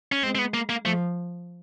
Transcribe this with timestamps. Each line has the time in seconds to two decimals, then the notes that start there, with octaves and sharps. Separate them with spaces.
0.12 C#4
0.23 G#3 C4
0.35 C4
0.38 B3
0.54 A#3
0.69 A#3
0.85 F3 A3